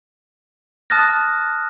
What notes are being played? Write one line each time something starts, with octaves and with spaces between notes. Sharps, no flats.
A5 D#6 F6 F#6 A6 A#6